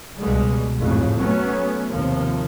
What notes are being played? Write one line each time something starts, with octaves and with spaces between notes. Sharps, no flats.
C#2 B2 G3 G#3
A1 F2 G#2 C#3
F#3 A3 B3 C#4
D#2 C3 F3